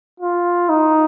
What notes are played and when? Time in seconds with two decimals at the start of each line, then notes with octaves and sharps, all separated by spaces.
0.20 F4
0.69 D#4